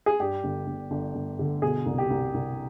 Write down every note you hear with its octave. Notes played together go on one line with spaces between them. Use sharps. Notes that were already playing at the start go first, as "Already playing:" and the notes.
G#4
G2 G4
G1
G1
G1
G1
D3
B2 G#4
C2
G4
C2
C2